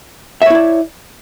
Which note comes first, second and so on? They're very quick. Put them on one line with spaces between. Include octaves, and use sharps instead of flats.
E5 C#5 E4 D5